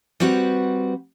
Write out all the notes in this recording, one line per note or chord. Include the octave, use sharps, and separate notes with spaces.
G3 C4 F#4 B4 F#5